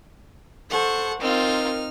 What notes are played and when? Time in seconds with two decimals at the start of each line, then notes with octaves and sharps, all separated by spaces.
0.70 A4 C5 F#5 C#6
1.20 C4 D#4 F4 A#4 F6